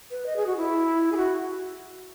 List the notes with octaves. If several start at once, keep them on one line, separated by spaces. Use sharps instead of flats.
B4
D#5
G#4
F#4
E4
G#4
F#4